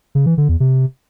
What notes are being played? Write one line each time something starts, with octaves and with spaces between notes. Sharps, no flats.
C#3
E3
D3
E2
C3